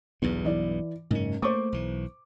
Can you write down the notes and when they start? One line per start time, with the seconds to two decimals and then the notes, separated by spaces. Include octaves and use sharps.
0.22 B1 E2 G2
0.45 E3 D5
1.11 F#1 G#2 C#4
1.42 A3 A#3 C5 C#6 D6
1.72 B1 E3